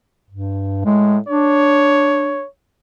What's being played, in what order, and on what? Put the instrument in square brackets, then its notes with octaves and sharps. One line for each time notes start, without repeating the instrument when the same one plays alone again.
[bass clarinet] G2
[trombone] A2 [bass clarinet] G#3
[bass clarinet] D4 [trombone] C#5